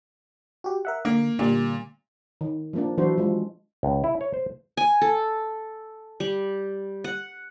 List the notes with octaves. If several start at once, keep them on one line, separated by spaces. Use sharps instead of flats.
F#4 G4
A#4 E5 F#5
D3 A#3
A#2 D3 G3 A#3
D#3
F3 A#3 D4
E3 F#3 D4 E4 F#4 C5
F3 G#3
C#2
E4
C#5
C5
G#5
A4
G3
F#5